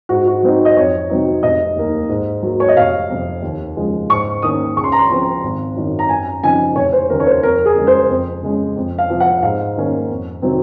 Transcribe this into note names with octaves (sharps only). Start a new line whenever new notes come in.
G#2 F#4
F#4
F#3 C4 D#4
D#5
F2 C#5
C3 F#3 C4 D#4
F1 D#5
D#2 D#3 A#3
G#2
F#3 A#3
C#5
D#5
F1 F5
F2 C3
D#2
C#3 F3 G#3
G#2 C#6
D#3 A#3 C#4 D#6
C#2 C#6
C6
A#5
C6
C#3 F3 C4
G#1
F#2 D#3
A#5
F#2 G#5
C#3 F3 C4 D#4 G#5
F1 C#5
C5
D#2 C#3 A#4
C#5
C5
F2 A#4
G#4
C#3 G#3 C#4
C5
F2
C#3 G#3 C#4
F2
F5
C3 F3
F#5
G#2 F5
D#3 A#3 C#4
F2
C3 D#3 F#3 C4